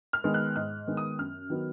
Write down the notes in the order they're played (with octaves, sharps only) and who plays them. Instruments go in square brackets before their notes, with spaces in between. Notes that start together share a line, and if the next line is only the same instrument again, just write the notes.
[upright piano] F6
D#3 G#3 B3
F#6
G#2 F#6
D#3 G#3 B3
D#6
F#2 F6
D#3 F#3 B3